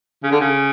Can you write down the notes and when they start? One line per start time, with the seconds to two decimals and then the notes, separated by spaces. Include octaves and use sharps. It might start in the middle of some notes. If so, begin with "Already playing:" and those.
0.23 C#3
0.31 D3
0.41 C#3